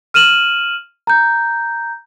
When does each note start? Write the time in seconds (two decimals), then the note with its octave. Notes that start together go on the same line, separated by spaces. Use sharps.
0.14 F6 D#7 E7 F#7
1.07 A#5 G6